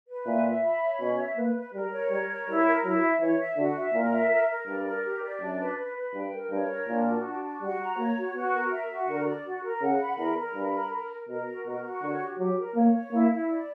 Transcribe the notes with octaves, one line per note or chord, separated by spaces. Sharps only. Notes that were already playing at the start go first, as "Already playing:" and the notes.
B4
A#2 E5
E5
B5
C#5
B2 C#4
E5
A#3 B4
B4
G3 A#4
C#5
G3 A#4
C#5
G3 E4
A#4
F#3 E4
E5
E3 C#5
E5
D3 F#4
E5
A#2 A#4
E5
A#4
A#4
G2 D5
A#4
G4
D5
F#2 D4
B4
B4
B4
G2 G5
A#4
G2 C#5
A#4
A#2 D4
F#4
D4
F#4
G3 F#4
A#5
A#3 C#5
F#4
B3 F#4
A#4
E5
F#4
D3 A#4
D5
F#4
A#4
C#3 F#5
B5
E2 A#4
A#4
G2 B5
A#4
A#4
A#4
B2 A#4
F#4
B2 A#4
F#4
D3 C#5
G4
F#3 G4
A#4
A#3 C#5
C#5
A#3 E4
E4
D5